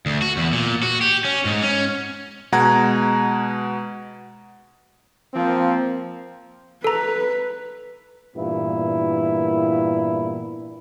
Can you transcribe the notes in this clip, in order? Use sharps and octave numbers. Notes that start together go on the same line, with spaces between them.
D2
F#4
E2
A#2
F#4
G4
C#4
G#2
C#4
B2 G#3 F#5 A#5 G#6
F3 A#3 C4
A4 B4 A#5
G2 A#2 E3 B3 E4